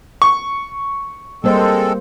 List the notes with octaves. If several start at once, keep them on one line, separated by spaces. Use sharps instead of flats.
C#6
G3 G#3 A#3 C4 A4 C5